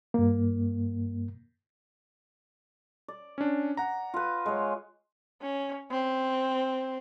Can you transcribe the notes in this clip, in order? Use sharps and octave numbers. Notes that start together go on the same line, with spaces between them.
G2 A#3
D5
C#4 D4
F#5 A#5
F4 B4
G#3 C#5
C#4
C4